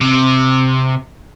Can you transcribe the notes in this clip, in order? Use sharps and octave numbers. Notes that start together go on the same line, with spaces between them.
C3